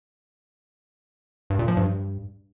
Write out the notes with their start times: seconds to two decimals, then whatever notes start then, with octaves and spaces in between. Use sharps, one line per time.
1.50 G2
1.59 A#2
1.68 F3
1.77 G2